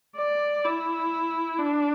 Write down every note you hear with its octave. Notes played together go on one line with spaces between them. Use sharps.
D5
E4
D4